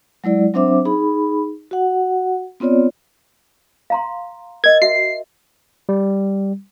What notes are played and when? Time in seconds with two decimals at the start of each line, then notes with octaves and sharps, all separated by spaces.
0.24 F#3 G#3 E4 D5
0.54 F#3 C4 D4 C5 E5 D6
0.85 D#4 G#4 B5
1.71 F#4 F#5
2.60 B3 C4 F4 C#5 D5
3.90 F5 A#5 C6
4.64 A#4 D#5 G#6
4.82 F#4 E5 C7
5.89 G3